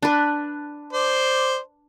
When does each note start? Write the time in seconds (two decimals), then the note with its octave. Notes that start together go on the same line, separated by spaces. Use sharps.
0.02 D4 B4
0.93 C5 D5